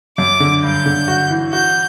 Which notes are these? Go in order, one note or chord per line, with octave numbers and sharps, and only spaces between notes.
F#2 D6
D3
G2 G6
D3
F#4
E3
F#4 G6